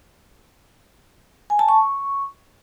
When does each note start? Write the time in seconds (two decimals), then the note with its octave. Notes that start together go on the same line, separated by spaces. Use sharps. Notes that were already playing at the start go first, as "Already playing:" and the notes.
1.50 G#5
1.59 A5
1.69 C#6